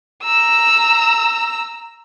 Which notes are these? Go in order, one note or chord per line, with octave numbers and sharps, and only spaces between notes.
A#5 E6